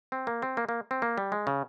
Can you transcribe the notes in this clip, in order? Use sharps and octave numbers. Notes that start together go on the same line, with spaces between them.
C4
A#3
C4
A#3
A#3
C4
A#3
G3
G#3
C#3